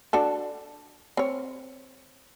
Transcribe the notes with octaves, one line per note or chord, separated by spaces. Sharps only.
D4 F#4 A4
C4 C#5